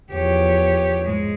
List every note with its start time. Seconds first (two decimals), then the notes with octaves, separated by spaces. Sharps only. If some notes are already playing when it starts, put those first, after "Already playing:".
0.12 E2 F3 G4 C#5
1.04 G#2 G#3